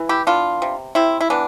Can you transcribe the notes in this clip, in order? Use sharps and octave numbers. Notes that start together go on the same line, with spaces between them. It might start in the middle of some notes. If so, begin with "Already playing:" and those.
Already playing: E3
E4 G4
B3 D4 F4
C3
C3 C4 E4
E4
E3 B3 D4